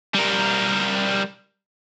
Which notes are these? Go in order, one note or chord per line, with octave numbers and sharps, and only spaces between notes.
G3 A#4